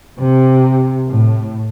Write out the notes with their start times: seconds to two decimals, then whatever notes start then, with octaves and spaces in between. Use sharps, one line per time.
0.19 C3
1.11 A2